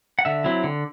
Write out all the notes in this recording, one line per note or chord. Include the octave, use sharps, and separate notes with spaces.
F#5
D3 E5
F#3 C4 E4
D3